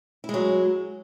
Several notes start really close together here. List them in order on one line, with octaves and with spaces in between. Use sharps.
E4 G#3 F#3